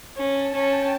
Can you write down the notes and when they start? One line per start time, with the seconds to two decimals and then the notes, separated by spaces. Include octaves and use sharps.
0.17 C#4 A5
0.54 C#4 G5